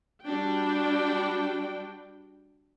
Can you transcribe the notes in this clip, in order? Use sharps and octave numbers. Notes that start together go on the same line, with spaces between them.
G3 D4 F#4 G5